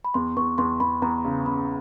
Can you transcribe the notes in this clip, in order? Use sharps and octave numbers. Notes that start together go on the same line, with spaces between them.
B5
E2 C6
E2 C#6
E2 C6
E2 B5
E2 A#5
C#3
C#3 B5